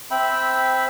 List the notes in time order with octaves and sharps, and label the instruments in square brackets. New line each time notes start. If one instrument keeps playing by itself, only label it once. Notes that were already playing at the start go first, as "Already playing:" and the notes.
[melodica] C4 E5 G5 B5